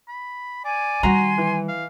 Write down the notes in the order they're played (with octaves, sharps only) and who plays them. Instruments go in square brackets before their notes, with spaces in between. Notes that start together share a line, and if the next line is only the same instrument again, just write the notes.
[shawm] B5
[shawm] D5 [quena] G#5
[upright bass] D#3 G3 [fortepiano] F#4 A#5 [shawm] C6
[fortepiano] E3
[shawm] F5